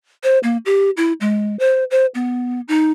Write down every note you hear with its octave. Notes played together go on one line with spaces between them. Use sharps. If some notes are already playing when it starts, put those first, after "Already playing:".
C5
A#3
G4
E4
G#3
C5
C5
B3
D#4